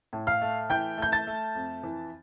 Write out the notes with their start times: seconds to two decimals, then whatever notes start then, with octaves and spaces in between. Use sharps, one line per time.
0.13 A2
0.27 F5 F6
0.42 A3
0.70 E3 G5 G6
0.98 A3 G6
1.12 A5 A6
1.27 A3
1.55 F2
1.83 E3